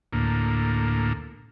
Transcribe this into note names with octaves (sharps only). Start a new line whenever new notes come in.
D2 A2 A#3